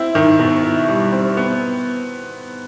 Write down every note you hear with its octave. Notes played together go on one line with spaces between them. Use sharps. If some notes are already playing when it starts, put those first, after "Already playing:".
Already playing: C4 E4
D#3
B2
E4
G3
C4
B3